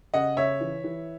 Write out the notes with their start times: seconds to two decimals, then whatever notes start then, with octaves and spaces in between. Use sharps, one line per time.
0.14 C#3 D#5 F#5
0.37 C#3 C#5 E5
0.61 E3
0.84 E3